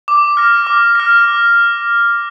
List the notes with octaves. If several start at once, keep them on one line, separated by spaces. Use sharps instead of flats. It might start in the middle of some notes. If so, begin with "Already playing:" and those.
D6
F6 A#6
D6
F6 A#6
D6